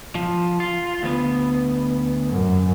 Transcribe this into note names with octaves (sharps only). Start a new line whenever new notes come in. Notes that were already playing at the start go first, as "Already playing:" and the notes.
F3
F4
D2 B3
F#2